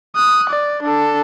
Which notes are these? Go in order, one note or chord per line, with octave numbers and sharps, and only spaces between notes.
D#6 F#6
D5
D4 A4